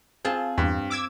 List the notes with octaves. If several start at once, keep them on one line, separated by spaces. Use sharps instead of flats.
C4 F4 G#4 A5
E2 G2
D6 E6 G#6